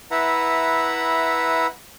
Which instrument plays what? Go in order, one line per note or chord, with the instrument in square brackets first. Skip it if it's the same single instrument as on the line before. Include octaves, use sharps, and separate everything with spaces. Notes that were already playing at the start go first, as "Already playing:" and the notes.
[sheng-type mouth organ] E4 B4 E5 F#5 A#5